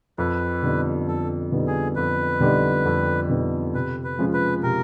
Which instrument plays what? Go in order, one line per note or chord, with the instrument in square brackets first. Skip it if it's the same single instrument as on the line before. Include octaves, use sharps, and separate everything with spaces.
[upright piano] F2 [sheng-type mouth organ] B4
[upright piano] D3 G3 B3 D#4
[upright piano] F2 [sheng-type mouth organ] A4
[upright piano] D3 G3 B3 D#4
[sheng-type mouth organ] G#4
[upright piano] F2 [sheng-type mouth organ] B4
[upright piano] D3 G3 B3 D#4
F2
D3 G3 B3 D#4
[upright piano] C3 [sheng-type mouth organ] B4
[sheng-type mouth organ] B4
[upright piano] F3 G#3 C#4 F4
[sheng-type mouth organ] B4
[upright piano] C3 [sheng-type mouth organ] A#4